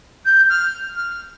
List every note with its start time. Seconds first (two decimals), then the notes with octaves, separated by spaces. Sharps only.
0.25 G6
0.49 F6
0.95 F6